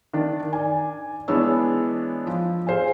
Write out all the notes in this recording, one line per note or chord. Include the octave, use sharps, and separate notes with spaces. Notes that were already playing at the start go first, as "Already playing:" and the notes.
D#3 D4
D5 G#5
E3 G#3 B3 D4 C#5 E6
F3
G#4 C5 F5 G#5